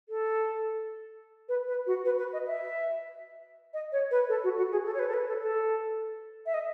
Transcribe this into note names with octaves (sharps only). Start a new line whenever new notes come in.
A4
B4
B4
F#4
B4
B4
D#5
E5
D#5
C#5
B4
A4
F#4
F#4
G#4
A4
C#5
B4
A4
B4
A4
A4
E5
D#5